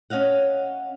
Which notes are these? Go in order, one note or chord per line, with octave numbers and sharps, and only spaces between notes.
C#4 C#5 D#5 F5 F#5